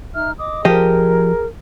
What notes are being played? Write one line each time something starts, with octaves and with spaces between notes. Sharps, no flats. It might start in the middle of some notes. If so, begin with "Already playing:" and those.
D#4 E5 F6
D#5 D6 D#6
F3 G4 G#4 A#4 D#5